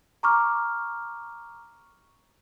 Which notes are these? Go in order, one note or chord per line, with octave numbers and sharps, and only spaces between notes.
A#5 C#6 D6 F6